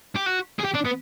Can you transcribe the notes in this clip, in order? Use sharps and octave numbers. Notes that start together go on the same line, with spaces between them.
G4
F#4
G#4
G4
D4
B3